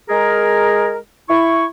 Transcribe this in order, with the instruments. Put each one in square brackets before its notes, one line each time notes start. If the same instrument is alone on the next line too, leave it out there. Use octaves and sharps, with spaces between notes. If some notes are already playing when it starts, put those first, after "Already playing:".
[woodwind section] G#3 G#4 A#4
E4 C#6